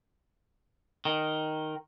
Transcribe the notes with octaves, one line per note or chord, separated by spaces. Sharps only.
D#3